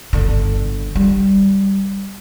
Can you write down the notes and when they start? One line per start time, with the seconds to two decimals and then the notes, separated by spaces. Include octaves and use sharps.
0.13 G1 D3
0.95 G3